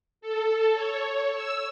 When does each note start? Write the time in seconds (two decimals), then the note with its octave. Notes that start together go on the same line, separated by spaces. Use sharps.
0.21 A4
0.74 C#5
1.34 E6